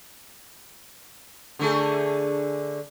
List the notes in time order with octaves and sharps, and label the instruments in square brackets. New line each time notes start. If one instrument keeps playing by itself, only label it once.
[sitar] D3 A3 G#4